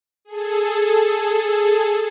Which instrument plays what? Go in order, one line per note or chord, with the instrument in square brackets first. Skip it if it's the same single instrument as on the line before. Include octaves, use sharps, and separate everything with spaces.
[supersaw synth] G#4 A4